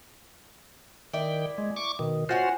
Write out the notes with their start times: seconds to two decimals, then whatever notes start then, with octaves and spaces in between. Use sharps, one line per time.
1.13 D#3 E4 D5 G5
1.58 G#3
1.76 C#6 D6
1.99 B2 D#3
2.29 C#4 F4 F#4 C5 F#5 G#5